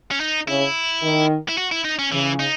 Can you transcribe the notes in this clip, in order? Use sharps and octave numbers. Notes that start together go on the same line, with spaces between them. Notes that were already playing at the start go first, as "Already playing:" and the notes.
C#4
D#4
C#3 E4
D#3
E4
F#4
E4
D#4
C#4
C#3 E3
D#4